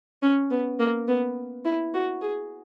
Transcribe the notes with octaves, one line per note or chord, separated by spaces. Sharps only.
C#4
B3
A#3
B3
E4
F#4
G#4